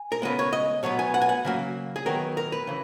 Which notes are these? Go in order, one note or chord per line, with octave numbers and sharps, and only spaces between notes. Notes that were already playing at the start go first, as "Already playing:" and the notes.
Already playing: G#5
A#4
C#3 G#3 B3 B4
C#5
D#5
B2 F#3 B3 C#5
G#5
F#5
G#5
F#5
C#3 F#3 A#3
G#4
D#3 F#3 B3 A#4
A#4
B4
C#3 E3